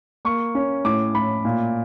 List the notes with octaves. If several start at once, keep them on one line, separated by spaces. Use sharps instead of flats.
A#3 C#6
C#4
A2 D6
A2 B5
A#2